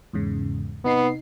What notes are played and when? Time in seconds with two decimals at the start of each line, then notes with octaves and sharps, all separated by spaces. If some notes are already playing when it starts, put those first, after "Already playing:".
0.13 E2 G#2 C#3
0.85 C3 B3 D#4 C7